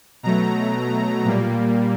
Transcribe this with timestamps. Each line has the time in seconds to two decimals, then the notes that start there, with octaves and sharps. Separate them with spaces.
0.23 B2 F#3 A3 A#5
1.25 A#2 G3 A#3